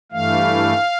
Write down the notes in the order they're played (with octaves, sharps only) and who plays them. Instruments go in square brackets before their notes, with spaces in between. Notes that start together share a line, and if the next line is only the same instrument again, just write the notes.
[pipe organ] G2 E3 A3 F5